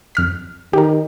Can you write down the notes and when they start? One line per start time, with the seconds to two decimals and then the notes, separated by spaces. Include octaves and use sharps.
0.15 F2 F6 B6
0.73 D#3 G4 A#4